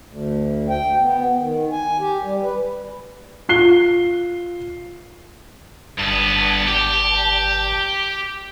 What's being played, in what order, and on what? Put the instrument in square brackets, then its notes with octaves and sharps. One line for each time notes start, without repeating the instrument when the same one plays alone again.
[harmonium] D2
G5
B3
D#3
G#5
G4
G3
B4
[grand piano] F4 C7 G7
[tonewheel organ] G1 A5 [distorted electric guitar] G2 B3
[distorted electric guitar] G4